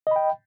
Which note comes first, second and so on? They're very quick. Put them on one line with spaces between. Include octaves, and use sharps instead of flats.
D#5 B5 G5